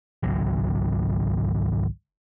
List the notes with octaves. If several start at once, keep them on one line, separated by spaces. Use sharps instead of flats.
G#1 C#2 F#3